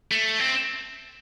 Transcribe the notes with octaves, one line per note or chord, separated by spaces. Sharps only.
A3
C4